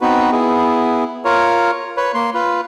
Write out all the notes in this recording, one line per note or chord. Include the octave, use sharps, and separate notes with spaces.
B3 C4 D#4 F#4 B4
B3 E4 G#4
F4 A#4 C#5
B4 C#5
A#3 C6
F4 B4